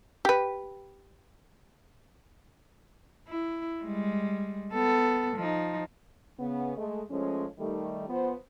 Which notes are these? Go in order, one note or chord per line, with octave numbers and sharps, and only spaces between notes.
G4 B4
E4
G3 G#3
B3 A4
F3 D#4
C#3 B3
G#3 A3
F3 G#3 A3 C#4
D#3 G3 A3
F3 B3 C5